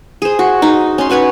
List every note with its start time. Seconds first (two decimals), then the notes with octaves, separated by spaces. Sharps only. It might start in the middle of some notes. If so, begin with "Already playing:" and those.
0.22 G#4 C5
0.39 F#4
0.62 D#4
0.98 C#4 C6
1.09 C#4 F#4 B4 C#5